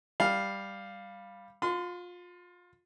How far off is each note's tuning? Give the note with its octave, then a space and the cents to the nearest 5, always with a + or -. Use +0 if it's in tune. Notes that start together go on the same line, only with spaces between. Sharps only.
G3 +5 F5 +0
F4 +25 C6 -30